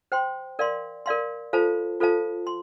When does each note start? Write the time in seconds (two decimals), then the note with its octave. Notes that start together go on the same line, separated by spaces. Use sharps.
0.12 C5 G5 C6
0.59 A#4 D5 F5 C6
1.06 A#4 D5 F5 C6
1.53 F4 A4 C5 F5 A5
2.00 F4 A4 C5 F5 A5
2.47 C6